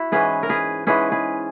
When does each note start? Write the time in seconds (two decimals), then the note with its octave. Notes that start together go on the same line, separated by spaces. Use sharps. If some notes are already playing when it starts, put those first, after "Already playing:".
Already playing: E4 F#4
0.12 G#2 E3 G#3 C#4 G#4 B4
0.43 A#4
0.49 G#4 B4
0.87 G#2 E3 G#3 C#4 G#4 B4
1.12 G#4 B4